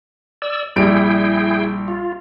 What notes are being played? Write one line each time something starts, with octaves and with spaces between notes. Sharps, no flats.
D5 E6
A#1 G3 E4 G#4 G5 D7
F4